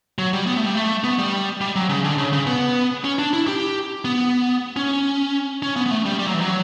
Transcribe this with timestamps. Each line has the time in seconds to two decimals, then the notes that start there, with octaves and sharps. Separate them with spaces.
0.18 F#3
0.33 G3
0.47 B3
0.57 A3
0.66 G3
0.75 A3
1.04 B3
1.19 G3
1.61 G3
1.76 F#3
1.89 C#3
2.04 D3
2.18 C#3
2.33 C#3
2.47 B3
3.04 C#4
3.19 D4
3.33 E4
3.48 G4
4.05 B3
4.77 C#4
5.63 C#4
5.76 B3
5.86 B3
5.91 A3
6.06 G3
6.19 G3
6.27 F#3
6.34 E3
6.41 F#3